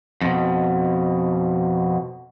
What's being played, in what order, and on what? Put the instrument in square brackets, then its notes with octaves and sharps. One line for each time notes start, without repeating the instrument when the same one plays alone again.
[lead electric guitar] F2 B2